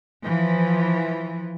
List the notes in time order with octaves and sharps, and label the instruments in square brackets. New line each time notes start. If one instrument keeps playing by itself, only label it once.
[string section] E3 F3